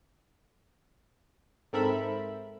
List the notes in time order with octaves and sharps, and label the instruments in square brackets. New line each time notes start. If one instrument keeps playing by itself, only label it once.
[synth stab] G#2 C4 A4 A#4 E5 B5